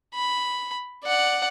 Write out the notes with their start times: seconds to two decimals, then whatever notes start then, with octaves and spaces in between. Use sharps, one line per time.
0.14 B5
1.04 D5 F#5